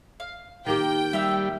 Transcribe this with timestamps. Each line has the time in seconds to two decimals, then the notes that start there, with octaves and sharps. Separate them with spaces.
0.20 F5
0.66 D#3 A#3 G4 G5
1.13 G3 E5 F5 E6